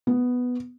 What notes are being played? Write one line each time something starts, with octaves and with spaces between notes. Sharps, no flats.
B3